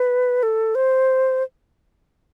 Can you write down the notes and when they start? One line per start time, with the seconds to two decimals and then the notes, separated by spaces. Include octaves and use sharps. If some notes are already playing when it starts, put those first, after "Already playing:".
Already playing: B4
0.43 A4
0.75 C5